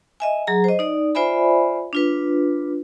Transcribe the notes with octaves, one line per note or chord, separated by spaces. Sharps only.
D#5 E5 G#5
F#3 G#4 A#5
C5 D#5
D#4 D5
F4 C5 D5 E5 G#5 B5
D4 F4 B4